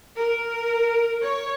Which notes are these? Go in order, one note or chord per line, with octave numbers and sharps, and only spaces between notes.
A#4
C#5